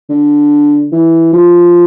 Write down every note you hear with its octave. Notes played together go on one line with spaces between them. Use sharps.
D3
E3
F3